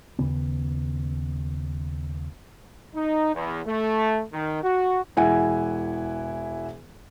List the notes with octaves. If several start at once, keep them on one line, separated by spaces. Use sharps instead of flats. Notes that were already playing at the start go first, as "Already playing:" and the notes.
D#2 C#3 B3
D#4
E2
A3
D#3
F#4
E1 E4 F#5 G#5